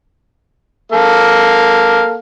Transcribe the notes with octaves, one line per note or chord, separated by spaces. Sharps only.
A#3 A4 F5